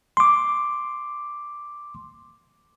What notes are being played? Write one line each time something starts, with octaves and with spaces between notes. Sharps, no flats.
C6 D6